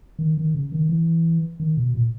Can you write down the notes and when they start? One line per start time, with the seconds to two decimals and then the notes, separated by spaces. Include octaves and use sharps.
0.19 D#3
0.37 D#3
0.55 C#3
0.72 D#3
0.89 E3
1.60 D#3
1.77 B2
1.95 A#2